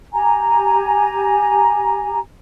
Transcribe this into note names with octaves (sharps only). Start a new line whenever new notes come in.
G4 G#5 A#5